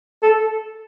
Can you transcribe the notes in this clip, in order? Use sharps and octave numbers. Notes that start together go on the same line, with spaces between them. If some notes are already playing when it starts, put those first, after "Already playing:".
A4